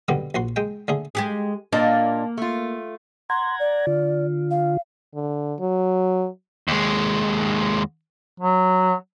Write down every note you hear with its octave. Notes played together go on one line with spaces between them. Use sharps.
B2 D3 G3 B3
A#1 F#4 C6
G#3 G5
D3 A3 G#4
G#3 G4 G#4
A#2 A#3 D4 D#5
A3 F4
F#5 A#5 C6 G#6
D5
D3 F4
F5
D3
F#3
D#2 G#3
F#3